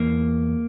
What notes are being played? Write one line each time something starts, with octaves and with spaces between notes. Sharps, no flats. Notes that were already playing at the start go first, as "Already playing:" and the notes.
Already playing: E2 A#3